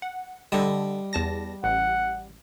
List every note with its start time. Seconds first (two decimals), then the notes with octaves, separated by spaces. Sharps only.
0.02 F#5
0.52 D3 G3 D#5 A5
1.13 E2 A5 A#6
1.64 A1 F#5